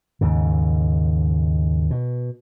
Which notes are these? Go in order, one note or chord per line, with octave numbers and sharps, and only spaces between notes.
D#2 G#2 C#3
B2